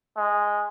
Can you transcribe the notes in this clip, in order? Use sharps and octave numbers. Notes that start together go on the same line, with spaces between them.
G#3